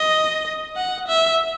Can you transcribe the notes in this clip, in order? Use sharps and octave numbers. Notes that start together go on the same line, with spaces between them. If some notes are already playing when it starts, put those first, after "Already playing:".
Already playing: D#5
F#5
E5